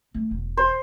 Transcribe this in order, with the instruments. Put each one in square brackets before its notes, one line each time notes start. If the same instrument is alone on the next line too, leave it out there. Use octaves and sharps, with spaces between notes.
[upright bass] A3
E1
[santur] C5